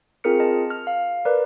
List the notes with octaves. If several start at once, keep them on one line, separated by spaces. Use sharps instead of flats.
C4 F4 G#4 A#4 F6 C#7
D#5 A5
F6
F5
A#4 B4 D5